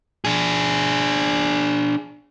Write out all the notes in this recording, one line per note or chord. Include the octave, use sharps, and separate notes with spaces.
D4 G#4